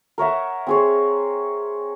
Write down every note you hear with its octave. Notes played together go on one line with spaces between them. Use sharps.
A#4 C#5 E5 F#5
C4 G#4 C#5